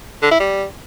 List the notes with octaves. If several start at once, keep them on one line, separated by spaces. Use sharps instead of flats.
D3
E4
G3